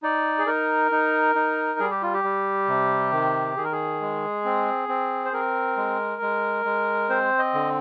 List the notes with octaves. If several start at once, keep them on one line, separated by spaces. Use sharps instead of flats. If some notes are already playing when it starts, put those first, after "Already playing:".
D#4 D5
G#4
D#4 A#4
D#4
D#4
G3 G#4
G4
F4
G4
G3
C3
D#3
D#3 G#4
A#4
G#4
G#3
C4
C4
C5
C4 A#4
G#3
G#3
G#3
C4 C5
D#5
D3